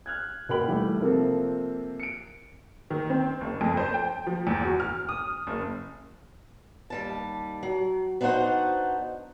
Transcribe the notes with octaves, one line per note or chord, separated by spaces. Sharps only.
F6 F#6 G#6
B2 A#3 C#4 G5 B5 F#7
E3 G3 A3
C3 F3 A#3 C4 A4
C#7 D7
D#3
C4
F#1
F2
C5
G5
F3
E2
F#4
F6
D#6
F#1
D#2 G3 A5
F#3
B3 D4 D#4 F#4 C5 F#5